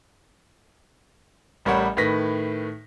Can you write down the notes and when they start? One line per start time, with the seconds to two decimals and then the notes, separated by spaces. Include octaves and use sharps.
1.65 A1 G3 A#4 C#5 F#5 B5
1.97 A2 D#3 B4 A#6 B6